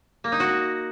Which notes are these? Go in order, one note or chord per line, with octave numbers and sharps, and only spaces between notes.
A#3
D#4
F#4